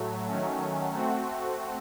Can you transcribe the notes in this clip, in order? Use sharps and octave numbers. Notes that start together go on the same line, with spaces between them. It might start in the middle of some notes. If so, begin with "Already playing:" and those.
Already playing: A2 F#3 A3
D#3 F#3 A3 C#4
A3 C4 F#4